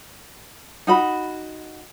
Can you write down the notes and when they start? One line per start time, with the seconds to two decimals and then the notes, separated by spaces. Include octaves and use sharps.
0.87 D#4 F#4 B5